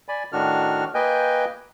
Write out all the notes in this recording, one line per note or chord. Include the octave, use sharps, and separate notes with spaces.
D5 G#5 B5
A2 D#3 D4 F#4 F6
A#3 B4 D#5 G5 G#5 G6